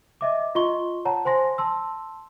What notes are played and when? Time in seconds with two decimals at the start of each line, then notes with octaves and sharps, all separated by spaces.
0.21 D#5 E5 D6
0.55 F4 D#5 C6 C#6 G7
1.05 C#5 F#5 A5 A#5
1.25 C5 G#5 C6 A#6
1.58 A5 C6 E6